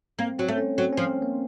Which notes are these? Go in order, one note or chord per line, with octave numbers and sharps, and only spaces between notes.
A#3 C4
F#3 C4
A3
C#4
F#3 C4
F3 C#4
C4
A#3